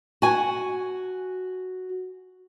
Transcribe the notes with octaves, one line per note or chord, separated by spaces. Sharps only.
F#4 G#5